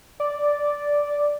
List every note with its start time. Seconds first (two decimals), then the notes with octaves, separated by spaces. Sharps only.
0.20 D5